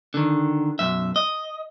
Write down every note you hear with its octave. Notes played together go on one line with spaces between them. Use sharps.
D3 D#3
B1 F#2 E5
D#5